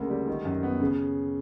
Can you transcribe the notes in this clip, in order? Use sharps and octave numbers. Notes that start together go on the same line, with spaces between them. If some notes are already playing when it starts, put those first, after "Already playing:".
Already playing: D2 C#3 A#3
G3
D#3
F#2
B3
C#3